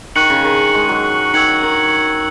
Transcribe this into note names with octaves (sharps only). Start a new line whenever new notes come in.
D#3 C#6 F#6 C#7 F#7
C#3
D#3
G#3
F#3
D#3 E6 G#6 C#7 F#7
D#3